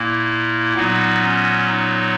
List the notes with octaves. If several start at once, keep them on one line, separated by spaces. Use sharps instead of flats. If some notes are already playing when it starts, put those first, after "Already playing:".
Already playing: A#2 A#3 E4
A#2 F#3 B3 D#4
C#4
D#4